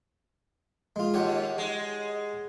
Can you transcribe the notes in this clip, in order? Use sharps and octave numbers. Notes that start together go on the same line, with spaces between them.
G#3 F4
D#2 G4 C#5 F#5
G#3